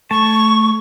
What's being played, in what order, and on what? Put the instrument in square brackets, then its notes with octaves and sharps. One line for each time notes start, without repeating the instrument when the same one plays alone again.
[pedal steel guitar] A3 A5 [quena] C#6